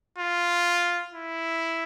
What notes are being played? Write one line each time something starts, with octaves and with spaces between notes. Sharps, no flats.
F4
E4